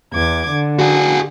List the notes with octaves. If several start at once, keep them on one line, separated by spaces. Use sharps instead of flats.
E2 D6 G#6
D3
F#4 G#4